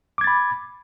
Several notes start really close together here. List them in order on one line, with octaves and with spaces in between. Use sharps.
D6 G#6 A6 B5